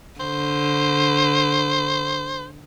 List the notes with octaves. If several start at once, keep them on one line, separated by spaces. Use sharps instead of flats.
D3 C5